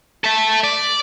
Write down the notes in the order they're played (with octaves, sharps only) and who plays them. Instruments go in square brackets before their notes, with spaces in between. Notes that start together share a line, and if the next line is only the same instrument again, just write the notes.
[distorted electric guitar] A4 E5
D5